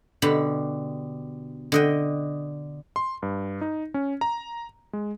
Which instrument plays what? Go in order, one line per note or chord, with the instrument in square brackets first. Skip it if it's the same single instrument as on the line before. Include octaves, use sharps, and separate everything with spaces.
[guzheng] B2 D3 G4 B5
D3 D#5 G5
[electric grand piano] C6
G2
D#4
C#4
A#5
G#3